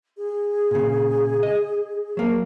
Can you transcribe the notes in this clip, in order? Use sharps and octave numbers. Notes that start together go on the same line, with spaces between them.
G#4
A#2 C#3
D#5
F#3 A#3